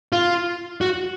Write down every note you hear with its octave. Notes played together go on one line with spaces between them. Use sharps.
F4
F#4